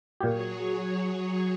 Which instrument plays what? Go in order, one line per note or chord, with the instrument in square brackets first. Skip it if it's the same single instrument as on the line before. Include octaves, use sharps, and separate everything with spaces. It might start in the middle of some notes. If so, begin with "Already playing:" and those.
[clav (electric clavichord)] A#2 G4 [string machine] F#3 G#4 C#5